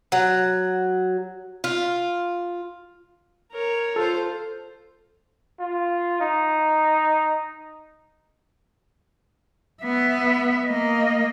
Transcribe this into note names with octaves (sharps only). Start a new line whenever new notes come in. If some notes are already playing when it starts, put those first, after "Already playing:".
F#3
F4
A#4 C#5
F4 A4 C5
F4
D#4
B3 E5
A#3 D#5